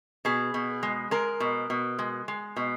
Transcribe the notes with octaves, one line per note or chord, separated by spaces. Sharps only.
B2 G#4
B2
G#3
G#3 A#4
B2
B2
G#3
G#3
B2